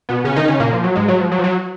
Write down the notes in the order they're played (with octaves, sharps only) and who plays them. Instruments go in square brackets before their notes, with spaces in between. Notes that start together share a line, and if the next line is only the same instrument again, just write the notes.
[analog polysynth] B2 B3
C#3 C#4
D#3 D#4
C#3 C#4
A#2 A#3
F3
F#3
G#2 G#3
F#3
F3
F#3
F3
F#3